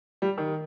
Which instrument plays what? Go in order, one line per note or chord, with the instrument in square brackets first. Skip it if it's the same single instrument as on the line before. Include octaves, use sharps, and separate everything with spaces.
[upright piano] G3
D#3